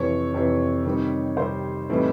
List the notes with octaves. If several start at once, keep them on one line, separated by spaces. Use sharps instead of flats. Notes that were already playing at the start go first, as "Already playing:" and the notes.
Already playing: F2 C3 E3 C#5 C#6
F2 C3 E3
C3 D#3 G3 C4 D#4
C3 D#3 G3 C4 D#4 C5 C6
A2 E3 G3 C4 D#4